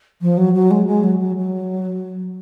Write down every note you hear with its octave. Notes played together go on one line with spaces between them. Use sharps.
F3
F#3
F#3
G#3
G#3
F#3
F#3
F#3